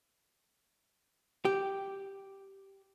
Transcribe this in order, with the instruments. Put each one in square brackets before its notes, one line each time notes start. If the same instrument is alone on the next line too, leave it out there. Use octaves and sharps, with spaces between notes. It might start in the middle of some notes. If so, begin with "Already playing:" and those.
[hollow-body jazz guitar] G4